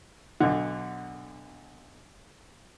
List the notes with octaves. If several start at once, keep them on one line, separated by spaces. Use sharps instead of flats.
B1 D3